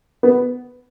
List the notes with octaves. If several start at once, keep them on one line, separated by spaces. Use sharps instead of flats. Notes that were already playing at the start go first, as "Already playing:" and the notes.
B3